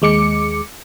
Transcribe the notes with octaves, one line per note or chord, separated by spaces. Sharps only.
D#2 G#3 D6 C#7